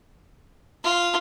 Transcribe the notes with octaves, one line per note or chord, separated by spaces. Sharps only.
F4